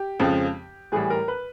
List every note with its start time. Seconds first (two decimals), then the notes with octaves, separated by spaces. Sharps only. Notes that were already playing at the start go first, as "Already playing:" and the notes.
Already playing: G4
0.20 F2 C#3 F3 G#3
0.92 A2 E3 G3 G#4
1.10 A#4
1.28 B4